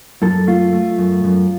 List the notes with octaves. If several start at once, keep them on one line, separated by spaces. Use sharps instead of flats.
F#2 A4
A3 F4
A3
F#2
F#2